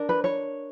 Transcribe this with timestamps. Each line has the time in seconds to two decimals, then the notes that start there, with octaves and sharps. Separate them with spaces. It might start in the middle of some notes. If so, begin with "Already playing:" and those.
Already playing: D4 A#4
0.09 B4
0.24 C#5